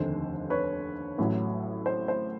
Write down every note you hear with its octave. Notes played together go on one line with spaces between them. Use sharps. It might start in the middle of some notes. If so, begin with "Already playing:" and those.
Already playing: F1 D#2 D3 C5
B4 C#5
A1 A2 F#3
C5
C5